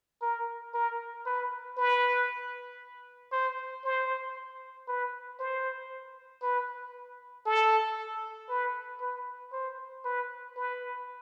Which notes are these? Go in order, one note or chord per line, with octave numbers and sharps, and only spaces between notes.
A#4
A#4
B4
B4
C5
C5
B4
C5
B4
A4
B4
B4
C5
B4
B4